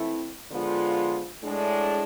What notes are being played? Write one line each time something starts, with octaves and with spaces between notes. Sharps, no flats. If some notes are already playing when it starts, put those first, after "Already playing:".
Already playing: E3 A3 C4 E4
D3 F3 G#3 B3 F4
A2 G#3 D4